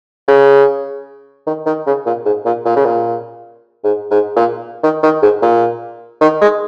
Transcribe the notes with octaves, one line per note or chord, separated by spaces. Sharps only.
C#3
D#3
D#3
C#3
A#2
G#2
A#2
A#2
C#3
A#2
G#2
G#2
A#2
D#3
D#3
G#2
A#2
D#3
G#3